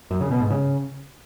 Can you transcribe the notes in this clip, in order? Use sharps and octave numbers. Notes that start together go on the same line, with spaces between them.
F#2
C#3
B2
G#2
C#3